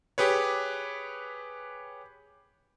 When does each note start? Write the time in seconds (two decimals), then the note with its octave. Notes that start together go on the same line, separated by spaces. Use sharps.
0.18 G4 G#4 B4 C#5